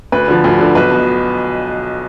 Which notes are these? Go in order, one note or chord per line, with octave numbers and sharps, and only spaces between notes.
D2 B4
D3 F3
D2
D3 F3
B1 B4
B2